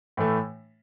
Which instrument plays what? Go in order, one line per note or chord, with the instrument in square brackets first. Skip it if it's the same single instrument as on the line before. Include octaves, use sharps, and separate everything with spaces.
[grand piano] A2 E3 A3